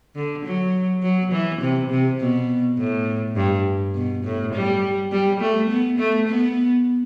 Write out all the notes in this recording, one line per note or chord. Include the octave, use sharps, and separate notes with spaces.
D3
F#3
F#3
E3
C3
C3
B2
A2
G2
B2
A2
G3
G3
A3
B3
A3
B3